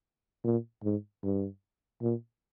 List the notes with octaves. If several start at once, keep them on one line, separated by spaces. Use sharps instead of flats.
A#2
G#2
G2
A#2